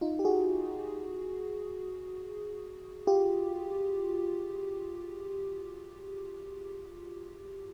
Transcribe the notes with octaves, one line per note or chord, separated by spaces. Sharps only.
D#4 F4
G4
F#4 G#4
F4 G4